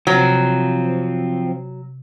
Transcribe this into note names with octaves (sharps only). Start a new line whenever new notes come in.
C3 F3 F#3 C4 A6